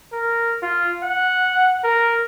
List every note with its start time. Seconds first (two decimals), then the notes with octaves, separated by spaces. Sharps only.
0.12 A#4
0.62 F4
1.03 F#5
1.84 A#4